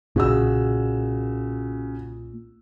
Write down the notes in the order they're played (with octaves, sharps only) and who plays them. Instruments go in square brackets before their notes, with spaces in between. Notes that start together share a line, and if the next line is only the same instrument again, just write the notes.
[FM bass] B1 [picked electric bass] A#2 [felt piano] C#3 F#4 E6